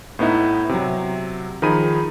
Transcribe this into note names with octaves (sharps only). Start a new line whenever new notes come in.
A2 B3 D#4 E4
C3 F#3
D#3 F3 D#4 G#4 B5 D#7